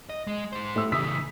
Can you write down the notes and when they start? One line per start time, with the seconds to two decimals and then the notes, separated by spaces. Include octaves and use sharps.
0.10 D#5
0.27 G#3
0.53 G#3 C5
0.76 A2 E6
0.92 C#3 E3 D#6 E6 B6